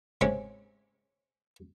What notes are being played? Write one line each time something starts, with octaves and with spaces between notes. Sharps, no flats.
G#2 C3 G#3 C4 C#4